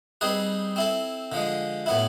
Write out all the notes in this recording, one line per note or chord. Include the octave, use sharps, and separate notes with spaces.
G3 C4 D#4 G#4 B4
C4 E4 A4
D3 F3 G#3
A2 F#3 B3 E4